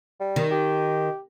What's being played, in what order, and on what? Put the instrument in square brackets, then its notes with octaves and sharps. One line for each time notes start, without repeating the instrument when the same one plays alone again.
[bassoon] G3
[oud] D#3
[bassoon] G4